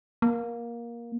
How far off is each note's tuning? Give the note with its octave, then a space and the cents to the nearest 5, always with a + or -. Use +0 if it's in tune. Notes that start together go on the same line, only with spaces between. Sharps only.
A#3 +15